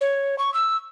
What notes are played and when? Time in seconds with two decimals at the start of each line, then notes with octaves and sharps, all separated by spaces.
0.01 C#5
0.39 C#6
0.54 E6